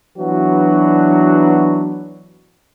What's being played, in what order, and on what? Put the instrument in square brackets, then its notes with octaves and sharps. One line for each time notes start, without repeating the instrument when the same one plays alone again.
[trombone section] E3 F#3 B3 D4 F#4